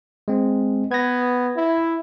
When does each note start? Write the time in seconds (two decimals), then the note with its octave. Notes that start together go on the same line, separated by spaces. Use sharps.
0.28 G#3 C4
0.91 B3 G#6 A#6
1.57 E4